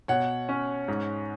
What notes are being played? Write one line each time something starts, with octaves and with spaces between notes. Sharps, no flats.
B2 C#5 F#5
C#4
G#2